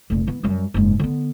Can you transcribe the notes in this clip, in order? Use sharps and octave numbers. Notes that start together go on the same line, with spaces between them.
F1 A#2
E3 B3
F#2 G3
F#1 G#2
D3 B3